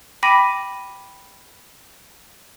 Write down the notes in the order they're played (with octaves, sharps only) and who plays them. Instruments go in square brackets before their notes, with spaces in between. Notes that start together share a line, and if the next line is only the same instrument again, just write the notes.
[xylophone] G5 B5 D6 A#6 B6 D#7